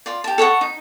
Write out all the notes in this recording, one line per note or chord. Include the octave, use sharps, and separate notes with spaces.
F4 D5
G4 A5
A4 C#5 D#5 F#5
D#4